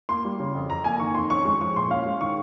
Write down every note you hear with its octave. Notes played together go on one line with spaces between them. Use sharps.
A#3 C6
G3
C#3
F2
F2 A#5
A#3 G#5
D#3 C#6
F2 C6
C#4 C#6
G#3 C#6
F3 C#6
A#2 C6
C#4 F5
G#3
D#3 C#6